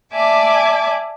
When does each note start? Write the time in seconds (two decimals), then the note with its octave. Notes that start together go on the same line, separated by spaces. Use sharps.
0.13 D5 E5 G#5 A5 D6